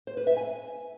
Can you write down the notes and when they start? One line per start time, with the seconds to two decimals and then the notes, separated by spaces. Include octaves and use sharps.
0.07 C5
0.17 B4
0.27 E5
0.37 G#5